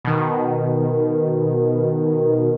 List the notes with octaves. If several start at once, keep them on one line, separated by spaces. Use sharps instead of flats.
B2 D#3